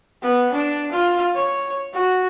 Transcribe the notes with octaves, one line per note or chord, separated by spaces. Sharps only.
B3
D4
F4
C#5
F#4